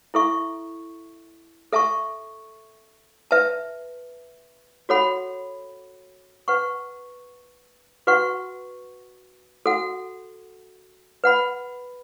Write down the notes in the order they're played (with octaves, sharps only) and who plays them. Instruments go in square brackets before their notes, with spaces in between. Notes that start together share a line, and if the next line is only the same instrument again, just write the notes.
[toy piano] E4 A4 E5 C#6
A4 E5 A5 C#6
B4 E5 A5
F#4 A4 C#5 F#5 B5
B4 F#5 C#6
F#4 B4 F#5 C#6
F#4 A4 F#5
B4 F#5 B5